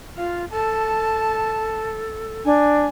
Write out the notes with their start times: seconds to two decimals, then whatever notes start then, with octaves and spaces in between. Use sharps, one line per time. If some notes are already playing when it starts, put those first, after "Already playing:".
0.17 F4 F5
0.51 A4 A5
2.45 D4 G#5